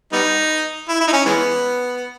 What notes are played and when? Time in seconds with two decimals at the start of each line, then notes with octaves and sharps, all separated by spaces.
0.12 G3 B3 D#4
0.88 E4
1.01 E4
1.07 D#4
1.13 C#4
1.26 E3 G#3 B3